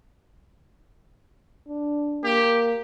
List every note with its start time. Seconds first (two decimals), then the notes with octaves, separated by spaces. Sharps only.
1.69 D4
2.24 A#3 G4